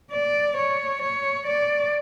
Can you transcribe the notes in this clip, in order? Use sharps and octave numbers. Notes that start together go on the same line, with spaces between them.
D5
C#5
C#5
D5